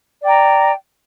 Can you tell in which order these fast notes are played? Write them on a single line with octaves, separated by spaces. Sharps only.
D5 G5 A#5